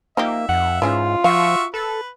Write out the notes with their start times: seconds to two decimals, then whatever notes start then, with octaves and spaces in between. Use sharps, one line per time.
0.17 F3 A#3 D#4 G4 E5
0.49 F2 F#5
0.82 G#2 E3 C#4 F4 G#4
1.24 F3 F#4 E5 F5 C#6
1.74 A4 B4